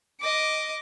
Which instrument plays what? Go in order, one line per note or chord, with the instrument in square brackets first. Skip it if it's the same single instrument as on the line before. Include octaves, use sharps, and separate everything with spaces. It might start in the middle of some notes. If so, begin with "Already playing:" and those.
[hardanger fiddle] D#5 D6